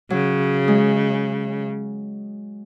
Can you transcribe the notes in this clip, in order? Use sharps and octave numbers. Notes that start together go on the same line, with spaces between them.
C#3 F#3
G#3